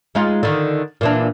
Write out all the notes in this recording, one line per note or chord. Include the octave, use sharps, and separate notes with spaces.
G#3 D#4 F4
D3 D#3
A#2 E3 D4